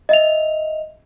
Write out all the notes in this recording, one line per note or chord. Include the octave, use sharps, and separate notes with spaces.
D#5 E5 F7